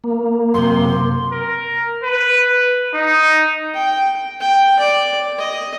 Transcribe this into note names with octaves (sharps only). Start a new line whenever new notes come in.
A#3
F#2 C3 C6
A#4
B4
D#4
G5
G5
D5
D#5